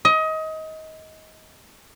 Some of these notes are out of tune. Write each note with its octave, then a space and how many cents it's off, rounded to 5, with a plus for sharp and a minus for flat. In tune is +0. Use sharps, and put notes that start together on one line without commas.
D#5 +25